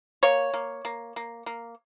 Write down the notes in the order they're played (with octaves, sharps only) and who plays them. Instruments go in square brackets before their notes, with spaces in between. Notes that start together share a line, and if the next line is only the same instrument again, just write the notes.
[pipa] A#3 C#5
A#3
A#3
A#3
A#3